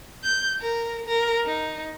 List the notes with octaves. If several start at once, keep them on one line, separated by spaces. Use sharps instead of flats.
G6
A#4
A#4
D#4